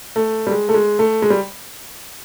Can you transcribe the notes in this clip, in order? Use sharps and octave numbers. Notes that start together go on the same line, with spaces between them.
A3
G3
G#3
A3
G#3
A3
G#3
G3